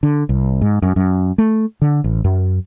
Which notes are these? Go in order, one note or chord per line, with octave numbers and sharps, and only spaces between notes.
D3
C2
G#2
F#2
F#2
A3
D3
A1
F#2